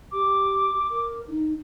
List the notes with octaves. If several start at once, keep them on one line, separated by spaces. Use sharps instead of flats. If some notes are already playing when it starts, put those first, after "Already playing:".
G4 D6
A#4
D#4